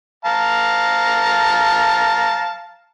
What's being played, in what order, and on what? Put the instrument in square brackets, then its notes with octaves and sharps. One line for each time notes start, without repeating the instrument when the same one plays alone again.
[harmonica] F5 A5 A#5